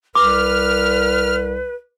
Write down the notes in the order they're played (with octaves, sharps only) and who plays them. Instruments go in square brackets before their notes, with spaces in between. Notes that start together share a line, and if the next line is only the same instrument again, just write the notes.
[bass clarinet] C2 [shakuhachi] B4 [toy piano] D6 [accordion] F6